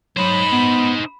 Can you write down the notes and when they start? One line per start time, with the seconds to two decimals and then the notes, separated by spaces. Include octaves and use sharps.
0.17 F#3 D#4 C5 B5
0.52 B3